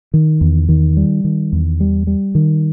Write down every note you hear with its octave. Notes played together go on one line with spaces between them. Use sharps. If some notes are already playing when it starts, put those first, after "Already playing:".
D#3
E2
D#3
G3
D#3
E2
G3
G3
D#3